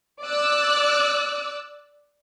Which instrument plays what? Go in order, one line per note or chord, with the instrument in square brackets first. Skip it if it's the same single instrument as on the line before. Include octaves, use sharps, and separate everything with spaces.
[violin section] D5 D6 E6 F#6